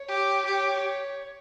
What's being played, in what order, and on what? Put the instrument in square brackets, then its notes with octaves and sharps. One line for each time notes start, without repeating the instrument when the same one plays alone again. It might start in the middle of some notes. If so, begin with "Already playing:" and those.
Already playing: [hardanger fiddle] C#5
[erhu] G4
[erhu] G4 [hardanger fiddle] C#5